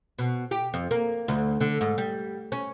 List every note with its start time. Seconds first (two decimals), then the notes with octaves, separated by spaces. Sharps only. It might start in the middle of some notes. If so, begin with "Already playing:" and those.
0.19 B2
0.51 G4
0.74 F2
0.91 A#3
1.28 D2
1.60 D3
1.81 G#2
1.98 G3
2.52 C#4